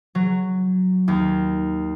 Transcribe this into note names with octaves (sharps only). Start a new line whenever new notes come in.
F#3
D#2